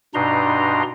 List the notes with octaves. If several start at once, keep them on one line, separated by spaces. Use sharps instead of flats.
G2 B2 D4 D#4 A#5 C6